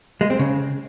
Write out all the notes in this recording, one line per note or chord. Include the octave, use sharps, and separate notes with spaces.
G#3
C4
C#3